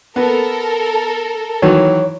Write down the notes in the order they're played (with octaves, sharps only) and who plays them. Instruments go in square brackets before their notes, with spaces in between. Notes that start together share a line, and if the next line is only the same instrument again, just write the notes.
[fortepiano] B3 [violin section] A4 A#4
[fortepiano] D#3 E3 F#3 [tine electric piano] C#5